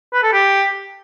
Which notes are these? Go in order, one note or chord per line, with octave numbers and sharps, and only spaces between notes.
B4
A4
G4